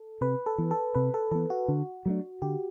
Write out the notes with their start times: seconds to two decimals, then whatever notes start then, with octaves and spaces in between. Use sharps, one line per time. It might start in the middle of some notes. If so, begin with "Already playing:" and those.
Already playing: A4
0.21 C3 B4
0.46 A4
0.58 E3 B3
0.71 A4
0.95 C3 B4
1.14 A4
1.31 E3 B3 A4
1.50 F#4
1.68 D3
2.06 F#3 A3 D4
2.42 D3 G4